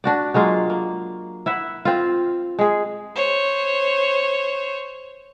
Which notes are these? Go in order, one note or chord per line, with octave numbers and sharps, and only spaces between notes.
D4 F#4 D5
F#3 G#3 A#3 F4
A#3
E4 E5 F#5
C4 F4
G#3 G#4
C5 C#5